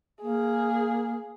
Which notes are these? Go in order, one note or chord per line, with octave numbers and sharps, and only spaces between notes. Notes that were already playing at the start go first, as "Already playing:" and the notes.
A#3 G#4